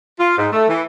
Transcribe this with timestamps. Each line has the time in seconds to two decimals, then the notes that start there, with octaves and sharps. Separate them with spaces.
0.20 F4
0.38 G#2
0.53 A3
0.69 E3